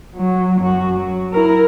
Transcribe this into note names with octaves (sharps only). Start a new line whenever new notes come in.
F#3
F#2 F#4
F#3
E4 A#4